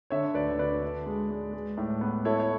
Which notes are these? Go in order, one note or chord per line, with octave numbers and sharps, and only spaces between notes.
D3 C#5 E5
D2 B4 D5
D3 B4 D5
D4
G#3
G#3
G#3
A2
B3
E4 A4 C#5
C#5